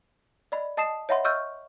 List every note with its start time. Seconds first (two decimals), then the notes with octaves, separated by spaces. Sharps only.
0.52 D5 D#5 B5
0.77 D#5 A5 D#6 C7 E7
1.09 C#5 D#5 E5 F#5 B5 C6
1.24 D#5 C#6 E6 F6 G6